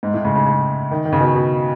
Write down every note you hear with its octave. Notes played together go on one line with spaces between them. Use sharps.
G#2
A2
C#3
C#3
C#3
D#3
D#3
C#3
B2
B2